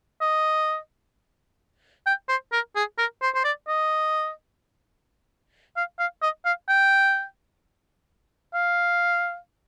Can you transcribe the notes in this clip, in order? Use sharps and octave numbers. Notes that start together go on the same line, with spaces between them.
D#5
G5
C5
A#4
G#4
A#4
C5
C5
D5
D#5
F5
F5
D#5
F5
G5
F5